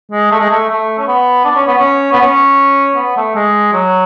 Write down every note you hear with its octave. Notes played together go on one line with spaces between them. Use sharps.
G#3
A3
G#3
A3
A3
C#4
B3
D4
C#4
B3
C#4
B3
C#4
B3
A3
G#3
F#3